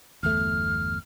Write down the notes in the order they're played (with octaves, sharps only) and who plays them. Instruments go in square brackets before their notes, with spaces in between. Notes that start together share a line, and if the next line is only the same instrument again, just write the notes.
[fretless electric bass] G1 E2 A3 [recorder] F6